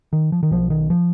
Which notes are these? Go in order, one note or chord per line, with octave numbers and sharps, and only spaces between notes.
D#3
F3
D#3
B1 B2 F3
D#3
F3